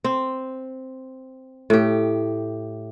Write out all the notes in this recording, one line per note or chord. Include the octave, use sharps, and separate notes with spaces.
C4
A2 G4